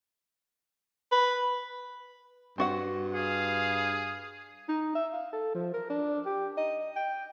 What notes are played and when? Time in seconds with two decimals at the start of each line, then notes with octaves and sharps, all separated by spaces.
1.12 B4
2.58 G2 C4 F#4 F#5
3.13 G#4 F5
4.69 D#4
4.95 E5
5.13 F5
5.33 A4
5.55 F3
5.74 A#4
5.90 D4
6.26 G4
6.57 D#5
6.96 G5